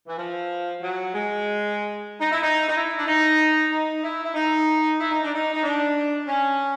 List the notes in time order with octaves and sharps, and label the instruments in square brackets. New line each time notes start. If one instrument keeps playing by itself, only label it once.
[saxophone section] E3
F3
F#3
G#3
D#4
E4
D#4
D#4
E4
D4
D#4
D#4
E4
E4
D#4
E4
D#4
D4
D#4
D#4
D4
C#4